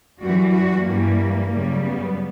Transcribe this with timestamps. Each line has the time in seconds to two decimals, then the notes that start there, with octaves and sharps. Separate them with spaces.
0.20 F#2 E3 G3 F#4
0.52 F#4
0.85 G2 E3 G3 A#3
1.50 F#2 C#3 G3
1.84 B3